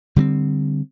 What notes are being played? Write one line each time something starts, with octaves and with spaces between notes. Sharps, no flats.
D3 G3 A#3 C4